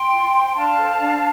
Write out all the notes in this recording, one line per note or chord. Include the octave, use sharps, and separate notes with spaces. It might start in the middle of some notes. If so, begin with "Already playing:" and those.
Already playing: G5 C6
F4
C5
D4 F5 A5
A4 C5
D4